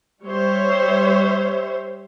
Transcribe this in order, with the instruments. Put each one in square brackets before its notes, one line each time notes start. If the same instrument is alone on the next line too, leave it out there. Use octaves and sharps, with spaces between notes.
[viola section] G3 C5 C#5 E5